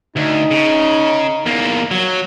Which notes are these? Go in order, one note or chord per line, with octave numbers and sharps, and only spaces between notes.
D2 D#4
C#3
E2 A#3
F#3